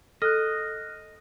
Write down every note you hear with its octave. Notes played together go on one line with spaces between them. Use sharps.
A4 D#5 F6 F#6